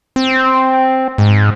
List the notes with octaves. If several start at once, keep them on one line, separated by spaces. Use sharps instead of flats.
C4
G#2